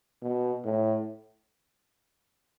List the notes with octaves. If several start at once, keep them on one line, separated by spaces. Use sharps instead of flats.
B2
A2